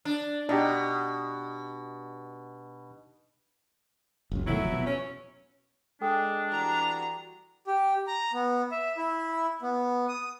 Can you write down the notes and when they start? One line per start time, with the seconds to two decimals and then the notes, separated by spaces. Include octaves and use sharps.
0.05 D4
0.49 B2 D4 D#4 G4
4.31 F#1 C#2
4.47 B2 D#3 F#3 A3 E4
4.59 F1 F2
4.72 B2
4.86 C#4
6.01 G#3 D4 A4 G5 D#6
6.51 E3 G3 F#4 A#5
7.67 G4
8.08 A#5
8.33 B3
8.72 E5
8.97 E4
9.62 B3
10.08 D#6